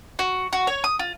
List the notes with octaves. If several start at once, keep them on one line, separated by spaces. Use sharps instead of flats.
F#4
F#4
C#5
D#6
F4